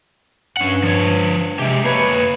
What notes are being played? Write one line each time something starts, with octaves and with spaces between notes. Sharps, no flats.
G2 C#4 F#5
F3 C#5
C3 G#3 G4
A#3 B4 C#5